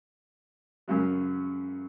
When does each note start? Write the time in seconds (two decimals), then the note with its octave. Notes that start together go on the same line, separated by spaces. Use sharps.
0.88 F#2 C#3 F#3